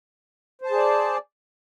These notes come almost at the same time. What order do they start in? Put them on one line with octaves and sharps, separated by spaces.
C5 A5 G#4 D5